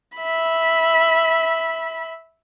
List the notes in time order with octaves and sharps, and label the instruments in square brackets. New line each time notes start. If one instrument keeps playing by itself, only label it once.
[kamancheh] E5 B5